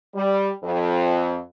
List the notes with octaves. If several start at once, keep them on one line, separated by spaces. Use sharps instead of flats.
G3
F2